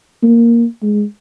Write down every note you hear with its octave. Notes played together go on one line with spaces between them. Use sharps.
A#3
G#3